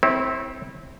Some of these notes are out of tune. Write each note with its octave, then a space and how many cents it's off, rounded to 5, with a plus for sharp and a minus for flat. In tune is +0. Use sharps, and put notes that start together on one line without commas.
C4 -5 E4 -20 C#5 -40